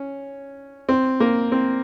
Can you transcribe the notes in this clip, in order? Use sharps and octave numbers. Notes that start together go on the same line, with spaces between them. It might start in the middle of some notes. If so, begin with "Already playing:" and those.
Already playing: C#4
C4
A#3
C4